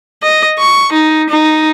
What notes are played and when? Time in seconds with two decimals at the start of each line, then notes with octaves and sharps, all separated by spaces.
0.23 D#5
0.59 C#6
0.93 D#4
1.30 D#4